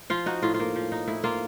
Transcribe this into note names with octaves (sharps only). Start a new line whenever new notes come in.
F3 F4
D#4 F#4
A2 F4
F4
A#3
F3
D#4
A2 E4
A#3 F4